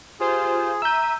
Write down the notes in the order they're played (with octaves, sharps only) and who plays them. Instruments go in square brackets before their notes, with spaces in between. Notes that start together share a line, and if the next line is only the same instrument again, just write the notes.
[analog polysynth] F4 C5 [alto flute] G4 [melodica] G#4
[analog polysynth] E5 D#7 [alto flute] A#5 [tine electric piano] E6 G6